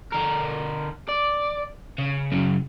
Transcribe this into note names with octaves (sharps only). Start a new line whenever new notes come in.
D3 A#4
D5
C#3
F#2 C#3